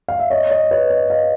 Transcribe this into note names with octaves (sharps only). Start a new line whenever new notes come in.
F5
E5
C#5 D#5
C#5 D#5
B4 C#5
C#5 D#5
D#5 F5